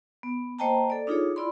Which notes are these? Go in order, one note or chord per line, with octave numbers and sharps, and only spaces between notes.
B3
A#3 C5 D#5 G5 A5 A#5
A4 D5
D4 D#4 F4 G#4 A4 C#5
E4 F4 D5 B5 C6